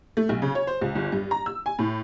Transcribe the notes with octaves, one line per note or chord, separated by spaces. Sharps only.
A3
B1
C#3
C#5
C5
C#2
G1
G2
A#5
E6
G#5
A2